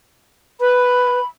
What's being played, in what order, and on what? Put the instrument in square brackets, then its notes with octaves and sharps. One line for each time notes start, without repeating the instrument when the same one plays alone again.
[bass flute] B4 [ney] B5